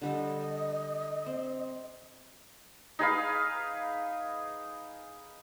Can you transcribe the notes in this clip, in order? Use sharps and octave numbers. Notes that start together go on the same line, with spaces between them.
D3 G3 A4 D#5
C4
D#4 G#4 B4 F5